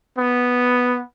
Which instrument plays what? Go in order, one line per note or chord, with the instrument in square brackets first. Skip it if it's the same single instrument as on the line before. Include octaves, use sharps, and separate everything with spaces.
[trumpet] B3